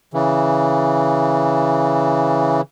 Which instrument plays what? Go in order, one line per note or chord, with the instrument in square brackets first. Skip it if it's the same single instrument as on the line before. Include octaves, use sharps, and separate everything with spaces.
[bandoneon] C#3 E3